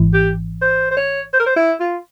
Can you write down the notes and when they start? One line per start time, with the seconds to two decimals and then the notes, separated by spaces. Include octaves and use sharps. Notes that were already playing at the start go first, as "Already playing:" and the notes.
Already playing: G#1 G#2 E3
0.13 G4
0.61 C5
0.91 C5
0.96 C#5
1.33 C5
1.39 A#4
1.46 C5
1.56 E4
1.80 F4